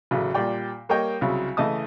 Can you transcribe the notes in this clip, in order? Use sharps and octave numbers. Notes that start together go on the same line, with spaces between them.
A1 C#3 F#3
A#2 G3 D5 G5
G3 A#3 C#5 D#5 G5
C2 C#3 F#3
C#3 E3 A3 D#5 A5 D#6